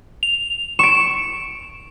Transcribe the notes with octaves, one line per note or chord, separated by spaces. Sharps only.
F7
C#6 D7 E7